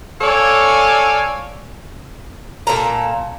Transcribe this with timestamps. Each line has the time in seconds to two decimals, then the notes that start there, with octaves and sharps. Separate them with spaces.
0.21 A4 C#5 D5 F5 G#5
2.67 A#2 A4 F5 A#5